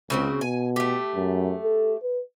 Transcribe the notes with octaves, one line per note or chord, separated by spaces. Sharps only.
C#2 C#3 C4 F#4
B2 G#5
A3 G4
F#2
A4
B4